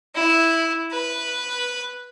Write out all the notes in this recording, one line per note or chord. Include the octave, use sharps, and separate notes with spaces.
E4
B4